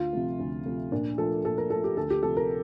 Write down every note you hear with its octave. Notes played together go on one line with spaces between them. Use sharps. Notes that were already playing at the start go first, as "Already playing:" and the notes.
Already playing: D2 F4
C3 F3 A3
D2
C3 F3 A3
A#2 D4
F3 A3 A4
A#2 A4
A#4
F3 A3 A4
G4
D2 A4
G4
C3 F3 A4
A#4